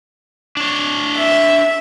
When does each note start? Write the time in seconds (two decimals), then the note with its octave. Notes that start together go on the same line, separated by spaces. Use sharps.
0.57 D4 C#5
1.16 E5